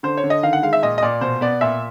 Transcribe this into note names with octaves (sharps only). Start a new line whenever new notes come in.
D3 C5
C#5
D3
D#5
D#3 F5
F#5
G#3 F5
E5
A#2 D#5
D#5
A#2 D5
B2 C5
B3 D5
A#2 E5